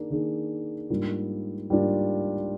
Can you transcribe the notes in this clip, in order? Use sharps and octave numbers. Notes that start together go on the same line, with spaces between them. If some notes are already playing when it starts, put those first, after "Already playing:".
Already playing: D#3 A#3 D4 G#4
D#3 A#3 D4 G#4
G#2 G3 A#3 D4 F4
G#2 G3 A#3 D4 F4